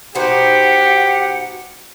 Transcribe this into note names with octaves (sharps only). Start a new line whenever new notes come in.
B2 D#4 G4 C5 F#5